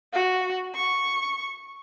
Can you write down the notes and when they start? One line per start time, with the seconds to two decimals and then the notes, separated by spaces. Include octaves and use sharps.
0.13 F#4
0.75 C#6